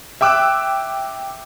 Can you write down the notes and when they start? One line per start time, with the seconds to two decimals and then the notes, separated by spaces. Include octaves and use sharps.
0.21 E5 G5 D6 E6 F#6